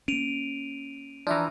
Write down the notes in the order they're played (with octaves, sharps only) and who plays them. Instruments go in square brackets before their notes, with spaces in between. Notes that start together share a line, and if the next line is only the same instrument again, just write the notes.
[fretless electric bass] A#3 C#4 [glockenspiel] D7 D#7 F7
[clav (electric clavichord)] E3 F3 [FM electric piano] D4 E5 A#5